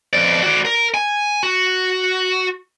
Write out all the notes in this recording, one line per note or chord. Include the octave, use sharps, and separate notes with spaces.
F2 D5
F#4 D5
A#4
G#5
F#4